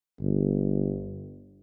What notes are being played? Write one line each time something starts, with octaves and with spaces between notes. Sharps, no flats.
G1